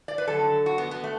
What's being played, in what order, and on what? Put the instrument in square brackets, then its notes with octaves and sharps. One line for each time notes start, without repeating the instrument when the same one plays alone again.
[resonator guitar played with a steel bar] D5
B4
F#2 D3 F#3 A4
F#4
B3
B3
A3